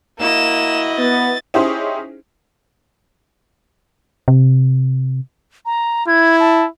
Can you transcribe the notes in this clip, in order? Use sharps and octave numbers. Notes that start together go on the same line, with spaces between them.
A#3 E4 F#4 D#5 E7
B3 A6
C#4 D#4 E4 G4 G#4 C5
C3
A#5
E4 G#6
A5